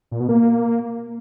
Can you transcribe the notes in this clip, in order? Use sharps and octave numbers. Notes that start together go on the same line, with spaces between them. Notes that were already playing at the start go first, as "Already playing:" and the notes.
A#2
B2
A#3